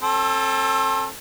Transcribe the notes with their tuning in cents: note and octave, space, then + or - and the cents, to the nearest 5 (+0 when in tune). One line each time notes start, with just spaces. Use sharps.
C4 +40 A4 +0